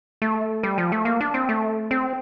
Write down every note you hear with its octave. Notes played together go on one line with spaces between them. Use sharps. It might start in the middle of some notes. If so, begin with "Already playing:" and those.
A3
G3
F3
A3
A#3
D4
C4
A3
C4